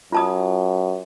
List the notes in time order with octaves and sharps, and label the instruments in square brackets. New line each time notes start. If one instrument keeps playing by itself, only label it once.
[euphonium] F#2 [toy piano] F4 A5 D#6